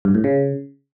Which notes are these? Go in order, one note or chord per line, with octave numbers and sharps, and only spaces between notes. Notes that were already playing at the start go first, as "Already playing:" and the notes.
G2
A2
C#3